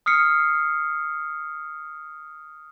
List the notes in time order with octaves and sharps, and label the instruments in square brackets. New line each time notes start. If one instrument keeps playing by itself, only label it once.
[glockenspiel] D#6 F6 C7 C#7